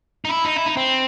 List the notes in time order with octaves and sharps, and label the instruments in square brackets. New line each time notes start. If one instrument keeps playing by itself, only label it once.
[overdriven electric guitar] D#4
E4
D#4
E4
D#4
C4